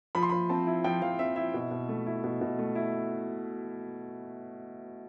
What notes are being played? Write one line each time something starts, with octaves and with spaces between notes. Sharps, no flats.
F3 B5
C6
F3 B5
C4 A5
E4
F3 G5
F3 F5
C4 E5
E4 E5
B2
B2
A3
E4
B2
B2
A3
E4